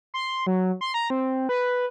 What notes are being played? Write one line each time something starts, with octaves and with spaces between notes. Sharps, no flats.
C6
F#3
C6
A#5
C4
B4